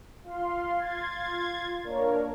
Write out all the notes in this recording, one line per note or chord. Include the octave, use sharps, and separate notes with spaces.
F4 F5 C6
F4 C6 G#6 A6
A#3 D4 A#4 C#5